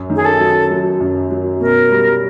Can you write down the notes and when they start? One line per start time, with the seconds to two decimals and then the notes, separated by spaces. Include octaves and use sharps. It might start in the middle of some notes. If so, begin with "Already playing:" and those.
Already playing: F#2
0.10 D#3
0.16 G#4
0.25 A4
0.40 F#3
0.70 F#3
1.01 F#2
1.31 F#3
1.61 B2 A#4
1.91 G3